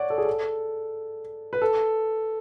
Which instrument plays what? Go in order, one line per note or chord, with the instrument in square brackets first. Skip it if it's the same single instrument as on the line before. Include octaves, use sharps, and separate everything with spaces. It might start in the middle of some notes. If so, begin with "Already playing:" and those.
Already playing: [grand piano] C#5 D5 F#5
A4
G#4
A4
B4
A4